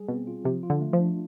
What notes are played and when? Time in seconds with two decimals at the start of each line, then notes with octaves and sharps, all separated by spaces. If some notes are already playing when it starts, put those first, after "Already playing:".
Already playing: G3 G#4
0.08 B2 C4
0.27 F4
0.44 C3 F3
0.63 F4
0.70 D3
0.81 A3
0.93 F3
1.00 D4